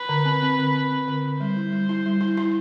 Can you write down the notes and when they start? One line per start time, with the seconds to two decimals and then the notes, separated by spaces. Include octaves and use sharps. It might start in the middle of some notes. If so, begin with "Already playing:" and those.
Already playing: B4
0.09 D3
0.25 C4
0.42 C4
0.59 D3
0.75 C4
0.90 C4
1.08 D3
1.24 D3
1.40 G3 C5
1.57 E4
1.72 G3
1.89 E4
2.06 G3
2.21 E4
2.37 E4